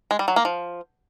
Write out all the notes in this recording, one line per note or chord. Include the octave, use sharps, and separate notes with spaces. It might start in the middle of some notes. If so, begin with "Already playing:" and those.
G#3
G3
F#3
A#3
F3